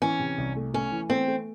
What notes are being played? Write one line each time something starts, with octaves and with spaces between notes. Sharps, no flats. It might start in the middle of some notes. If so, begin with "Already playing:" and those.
E3 C#4
C3
C2
A3
A3 C#4
E3
A3 C4
A3